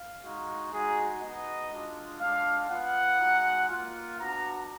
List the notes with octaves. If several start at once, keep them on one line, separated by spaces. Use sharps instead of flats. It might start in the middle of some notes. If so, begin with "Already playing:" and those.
Already playing: F5
G#3 D#4 F#4
G#3 D#4 F#4 G#4
B3 D#4 F#4 D#5
G#3 D4 F4
G#3 D4 F4 F5
B3 F4 F#5
G#3 D#4 F#4
A#3 F4
B3 D4 F#4 A#5